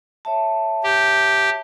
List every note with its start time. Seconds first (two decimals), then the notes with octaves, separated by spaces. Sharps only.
0.25 C#5 E5 A5
0.84 G4